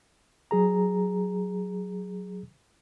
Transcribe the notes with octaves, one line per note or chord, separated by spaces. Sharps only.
F#3 G#4 A#5